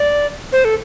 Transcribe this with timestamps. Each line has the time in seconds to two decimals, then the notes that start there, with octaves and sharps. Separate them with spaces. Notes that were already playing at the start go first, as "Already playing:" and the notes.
Already playing: D5
0.52 C5
0.65 A4